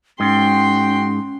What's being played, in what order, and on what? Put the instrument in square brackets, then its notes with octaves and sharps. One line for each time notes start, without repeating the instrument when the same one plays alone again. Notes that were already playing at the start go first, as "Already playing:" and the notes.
[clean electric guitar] G#2 [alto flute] C#4 [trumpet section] F#4 G5 [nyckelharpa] C6